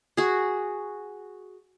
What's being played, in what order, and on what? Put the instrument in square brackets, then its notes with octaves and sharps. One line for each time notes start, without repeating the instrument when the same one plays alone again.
[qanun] F#4 G#4